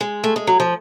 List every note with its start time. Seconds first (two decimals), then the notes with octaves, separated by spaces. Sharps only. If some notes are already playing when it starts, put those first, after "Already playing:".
0.01 G#3
0.24 A3
0.36 G#3
0.47 F#3
0.60 F3